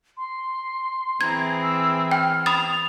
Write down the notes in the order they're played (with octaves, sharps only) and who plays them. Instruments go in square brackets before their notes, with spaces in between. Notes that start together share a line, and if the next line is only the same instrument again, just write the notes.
[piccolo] C6
[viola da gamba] E3 C4 G#4 [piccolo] A#5 [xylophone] G#6
[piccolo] E6
[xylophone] G5 [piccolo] F6
[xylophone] B5 D#6 A6 [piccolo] F7